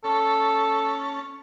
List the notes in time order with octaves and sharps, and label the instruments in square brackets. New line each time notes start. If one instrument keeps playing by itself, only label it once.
[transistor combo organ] C#4 A5 [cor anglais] A4